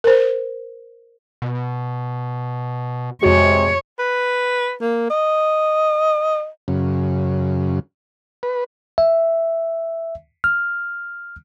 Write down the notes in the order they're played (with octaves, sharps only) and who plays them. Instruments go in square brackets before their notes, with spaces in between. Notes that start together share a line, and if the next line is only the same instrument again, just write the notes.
[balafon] A#4 C5
[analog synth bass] B2
[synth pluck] F2 F#4 [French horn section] C3 G#3 [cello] C#5
[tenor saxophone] B4
A#3
D#5
[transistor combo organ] F#2 C#3
B4
[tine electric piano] E5
F6